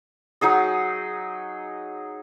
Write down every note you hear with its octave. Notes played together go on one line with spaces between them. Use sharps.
F#3 D#4 G#4 D#5